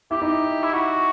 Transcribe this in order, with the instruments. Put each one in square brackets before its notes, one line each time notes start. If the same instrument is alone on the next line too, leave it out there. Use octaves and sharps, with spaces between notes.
[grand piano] E4 E5 [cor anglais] G4
[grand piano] D#4 D#5
[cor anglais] E4
F#4